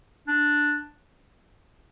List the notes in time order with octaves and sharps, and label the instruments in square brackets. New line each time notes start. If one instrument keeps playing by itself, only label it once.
[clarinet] D4